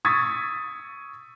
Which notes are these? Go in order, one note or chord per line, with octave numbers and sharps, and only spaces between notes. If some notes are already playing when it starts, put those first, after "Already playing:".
C#6 D#6 E6 G#6 A6 B6